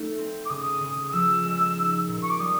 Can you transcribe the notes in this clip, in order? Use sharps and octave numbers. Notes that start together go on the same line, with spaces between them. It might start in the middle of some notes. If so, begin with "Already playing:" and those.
Already playing: A3 D#4
C4
D6
C#3 D#6
C#3
D#6
F3 E6
G#3
D#4
A#2
C#6
D6
G3 D#6